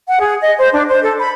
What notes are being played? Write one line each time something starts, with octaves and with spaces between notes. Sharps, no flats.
F#5
G#4
D#5
C5
D4
C5
A4
B5